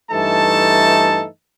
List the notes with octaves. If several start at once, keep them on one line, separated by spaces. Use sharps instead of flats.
G2 E3 A3 D#4 A4 A5